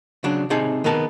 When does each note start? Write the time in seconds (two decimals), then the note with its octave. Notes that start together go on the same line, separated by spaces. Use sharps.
0.24 C#3 F#3 D4
0.50 C3 D#4 G#4 A5
0.84 D#3 B3 A#4 A5